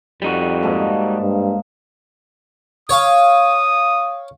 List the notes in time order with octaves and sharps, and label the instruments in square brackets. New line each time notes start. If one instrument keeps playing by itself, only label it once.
[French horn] F2 [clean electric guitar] G3 D#4 F#4
[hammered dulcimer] G#2 A#3 A5
[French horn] G2
[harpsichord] C#5 F5 [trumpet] D#6